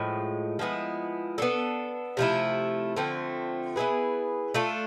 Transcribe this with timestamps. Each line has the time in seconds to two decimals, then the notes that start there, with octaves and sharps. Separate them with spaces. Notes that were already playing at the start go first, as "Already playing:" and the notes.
Already playing: A2 F3 G#3
0.59 F3 G#3 B3 E4
1.38 B3 D4 A4
2.17 C3 F3 A3 E4
2.96 D3 F3 A3 C4
3.76 B3 E4 G#4 B4
4.54 A3 D4 F4 A4